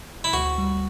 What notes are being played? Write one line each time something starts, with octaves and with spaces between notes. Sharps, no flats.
E4
D2 F#4
G3